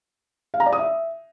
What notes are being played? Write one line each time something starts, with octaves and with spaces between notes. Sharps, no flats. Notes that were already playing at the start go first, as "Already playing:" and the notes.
F5
A#5
D5
D#6
E5